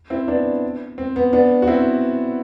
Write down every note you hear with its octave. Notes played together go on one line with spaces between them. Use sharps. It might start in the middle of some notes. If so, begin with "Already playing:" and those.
C4 E4
B3 D4
C4
B3
B3 D4
F#4
C4 E4